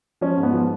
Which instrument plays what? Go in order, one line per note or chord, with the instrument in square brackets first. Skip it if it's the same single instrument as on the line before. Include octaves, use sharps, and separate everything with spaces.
[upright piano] F3 C#4
G#2
B3
F3